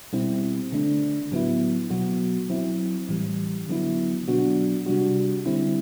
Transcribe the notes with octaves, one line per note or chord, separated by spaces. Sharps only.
B2 G3 C4 E4
D3 A3 D4
A2 F#3 B3 E4
B2 F#3 B3 F#4
F#3 C4 E4
A2 E3 G3
D3 F#3 B3 E4
B2 F#3 B3 D4 F#4
C3 G3 D4 F#4
D3 G3 C4 E4